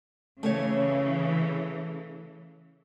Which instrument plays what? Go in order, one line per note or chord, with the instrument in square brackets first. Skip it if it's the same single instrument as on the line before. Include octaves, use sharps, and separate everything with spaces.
[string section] C#3 E3 [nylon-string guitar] A3 C#4 C#5